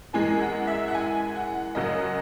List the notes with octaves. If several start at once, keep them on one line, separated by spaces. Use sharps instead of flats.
F#2 E3 G#3 G#5
F#5
E5
F#5
G#5
F#5
F#2 C#3 F#3 D#5